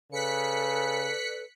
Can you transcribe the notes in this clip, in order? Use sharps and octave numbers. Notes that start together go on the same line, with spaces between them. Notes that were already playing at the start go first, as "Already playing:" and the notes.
C#3 A4 B4 D5 F#6 B6 C#7